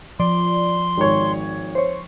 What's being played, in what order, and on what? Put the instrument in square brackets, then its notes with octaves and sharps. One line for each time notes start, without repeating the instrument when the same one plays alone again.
[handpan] F3 [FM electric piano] D5 [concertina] C6
[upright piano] G#1 C#5
[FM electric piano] C5 C#5